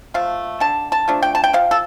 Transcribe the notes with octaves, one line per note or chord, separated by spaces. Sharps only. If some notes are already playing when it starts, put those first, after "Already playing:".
F3 A3 F5
D3 A5
A5
F3 A3 D4
G5
A5
G5
F3 F5
A4